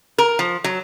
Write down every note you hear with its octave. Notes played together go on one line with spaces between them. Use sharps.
A#4
F3
F#3